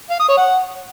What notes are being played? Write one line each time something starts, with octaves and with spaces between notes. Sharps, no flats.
F5
D#6
C#5
F#5